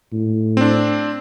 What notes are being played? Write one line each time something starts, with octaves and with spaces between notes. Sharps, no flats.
A2
C4 D4